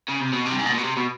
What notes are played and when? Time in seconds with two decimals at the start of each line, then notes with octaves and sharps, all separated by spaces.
0.09 C#3
0.21 C3
0.33 B2
0.46 C3
0.52 G2
0.59 G#2
0.66 B2
0.72 A#2
0.78 B2
0.84 C3
0.97 B2